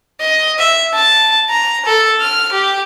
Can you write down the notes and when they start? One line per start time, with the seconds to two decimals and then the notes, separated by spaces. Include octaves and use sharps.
0.21 D#5
0.59 E5
0.94 A5
1.50 A#5
1.86 A4
2.21 F6
2.53 G4